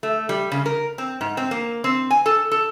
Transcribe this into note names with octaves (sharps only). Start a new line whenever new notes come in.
A3
G3
C#3
A#4
C4
G#2
C4
A#3
C4
G#5
A4
A4